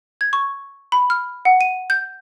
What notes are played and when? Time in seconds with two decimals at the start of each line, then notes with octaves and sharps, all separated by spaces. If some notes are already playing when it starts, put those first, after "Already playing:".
0.21 G#6
0.33 C#6
0.92 B5
1.10 F6
1.45 F#5
1.61 D#7
1.90 G6